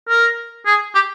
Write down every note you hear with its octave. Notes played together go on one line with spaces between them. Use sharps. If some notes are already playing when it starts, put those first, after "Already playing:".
A#4
G#4
G4